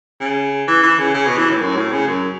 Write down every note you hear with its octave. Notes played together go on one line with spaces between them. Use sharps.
C#3
E3
E3
C#3
C#3
B2
E3
A2
F#2
A2
C#3
F#2